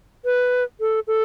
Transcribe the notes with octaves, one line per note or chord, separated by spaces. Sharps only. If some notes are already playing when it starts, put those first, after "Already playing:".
B4
A4
A4